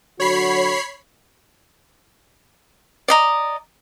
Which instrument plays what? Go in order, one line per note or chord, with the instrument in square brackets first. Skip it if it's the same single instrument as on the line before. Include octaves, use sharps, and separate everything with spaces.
[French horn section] D3 F#3 F#4 [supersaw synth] C#5 B5 C7
[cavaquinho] D5 D#5 A#5